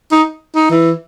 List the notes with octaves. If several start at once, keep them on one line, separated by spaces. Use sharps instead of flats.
D#4
D#4
E3